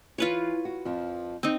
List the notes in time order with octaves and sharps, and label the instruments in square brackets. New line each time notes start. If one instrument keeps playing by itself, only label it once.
[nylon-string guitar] E3 [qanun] F4 B4 C#5
[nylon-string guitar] F#4
F2 F3
[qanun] C4 D#4